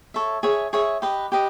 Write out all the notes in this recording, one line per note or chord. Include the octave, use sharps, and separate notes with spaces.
A4 C#5 E5
G#4 C#5 E5
G#4 C#5 E5
G4 B4 D#5
G4 B4 D#5